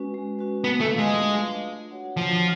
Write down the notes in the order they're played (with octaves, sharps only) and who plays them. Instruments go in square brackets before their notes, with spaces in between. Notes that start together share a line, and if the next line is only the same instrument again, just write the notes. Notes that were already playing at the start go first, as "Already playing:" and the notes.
Already playing: [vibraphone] G#3 C#4 F#4 B4
G#3
C#4 F#4 B4
[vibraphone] A3 [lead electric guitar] B3
[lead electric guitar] A3
[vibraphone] D4 F4 B4 F5
[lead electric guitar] G#3
[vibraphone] A3
D4 F4 B4 F5
D4
F#4 C#5 F#5
[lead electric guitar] F3 [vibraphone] D4